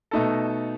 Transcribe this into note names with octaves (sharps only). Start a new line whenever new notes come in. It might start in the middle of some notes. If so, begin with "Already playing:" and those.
B2 A3 D#4 A4